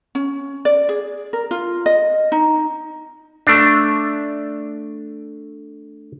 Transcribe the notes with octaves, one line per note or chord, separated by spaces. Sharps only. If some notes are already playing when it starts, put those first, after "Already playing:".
C#4
D5
G#4
A#4
F4
D#5
D#4
A3 D4